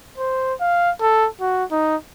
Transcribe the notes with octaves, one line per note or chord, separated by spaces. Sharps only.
C5
F5
A4
F#4
D#4